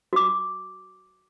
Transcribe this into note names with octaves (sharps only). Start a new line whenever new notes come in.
F#4 D6